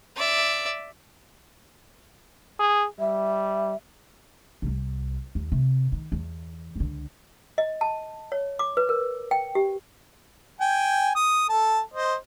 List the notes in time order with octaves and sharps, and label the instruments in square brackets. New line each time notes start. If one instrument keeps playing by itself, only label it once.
[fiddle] D5 E5
[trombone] G#4
[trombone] G3 [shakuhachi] E5
[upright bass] C2 C3
D#2
C3
D#3
E2
C#2 D3
[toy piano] D#5
A5
C#5
D6
B4
A#4
G5
G4
[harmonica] G5 G#5
D#6
A4 A5
C5 D#5